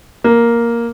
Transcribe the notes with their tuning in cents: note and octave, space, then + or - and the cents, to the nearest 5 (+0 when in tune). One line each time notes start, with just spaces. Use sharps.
A#3 +5